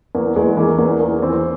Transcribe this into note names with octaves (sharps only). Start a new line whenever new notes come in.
E2 A#3
E2 G#3
E3 A#3
E2 A#3
E2 A#3
E3 C4